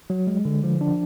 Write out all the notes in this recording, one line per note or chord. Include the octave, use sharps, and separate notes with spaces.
F#3
G#3
D3
F3
D4